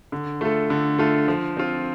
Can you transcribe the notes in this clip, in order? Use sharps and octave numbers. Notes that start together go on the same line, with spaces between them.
D3
A3 F4 A4
D3
A3 F4 A4
F3
C4 F4